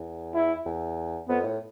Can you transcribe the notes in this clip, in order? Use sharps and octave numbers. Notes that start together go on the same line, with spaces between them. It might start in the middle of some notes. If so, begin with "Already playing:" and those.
Already playing: E2
E4
E2
F2 B3
A2